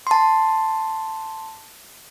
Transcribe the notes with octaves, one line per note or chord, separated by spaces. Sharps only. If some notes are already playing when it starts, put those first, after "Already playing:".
A5 C6